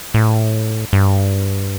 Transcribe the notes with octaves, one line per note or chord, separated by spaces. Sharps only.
A2
G2